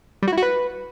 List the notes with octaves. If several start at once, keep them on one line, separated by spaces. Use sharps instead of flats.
G3
F#4
E4
F#4
B4